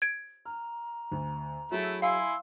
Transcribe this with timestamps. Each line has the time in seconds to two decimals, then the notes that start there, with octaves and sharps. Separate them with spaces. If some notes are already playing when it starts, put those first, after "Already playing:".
0.02 G#6 D7
0.46 A#5 F6
1.12 D2
1.72 F#3 A3 E4 G#4
2.02 E4 F5 G#5 C6 E6